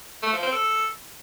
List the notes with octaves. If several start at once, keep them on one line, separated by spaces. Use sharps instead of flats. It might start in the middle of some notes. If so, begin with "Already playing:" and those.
A3
F3
C4
A4